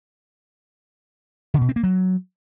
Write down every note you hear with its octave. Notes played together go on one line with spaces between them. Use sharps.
D3
B2
C4
A#3
F#3